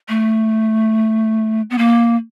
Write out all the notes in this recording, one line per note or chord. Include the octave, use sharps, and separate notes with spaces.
A3
B3
A#3